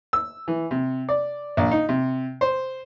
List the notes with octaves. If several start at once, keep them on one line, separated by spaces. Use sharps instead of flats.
E6
E3
C3
D5
A#1
D#4
C3
C5